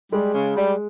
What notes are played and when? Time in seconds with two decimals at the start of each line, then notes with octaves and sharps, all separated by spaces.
0.12 G3 G#3
0.34 C#3
0.57 G3